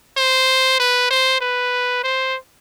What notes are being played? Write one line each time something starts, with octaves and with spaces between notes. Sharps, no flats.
C5
B4
C5
B4
C5